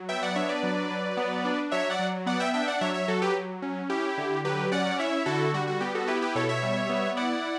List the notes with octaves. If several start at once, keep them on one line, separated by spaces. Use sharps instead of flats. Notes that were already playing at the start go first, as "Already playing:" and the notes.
Already playing: F#3
B3 E5 G5
D5 F#5
D4 C#5 E5
B4 D5
F#3
F#3
B3
D4
F#3 C#5 E5
D5 F#5
F#3
B3 D5 F#5
E5 G5
D4 E5 G5
D5 F#5
F#3 C#5 E5
C#5 E5
F#3 F#4 A4
G4 B4
F#3
C#4
E4 G4
D3
F#3 G4 B4
C#4 D5 F#5
E4 C#5 E5
D3 F#4 A4
G3 F#4
F#4
B3 G4
F#4 A4
E4 G4 B4
G4 B4
B2 A4 C#5
C#5 E5
G3
B3
E4 D5 F#5